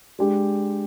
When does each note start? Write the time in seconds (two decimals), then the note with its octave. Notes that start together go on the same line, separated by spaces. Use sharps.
0.19 G#3 D4 G4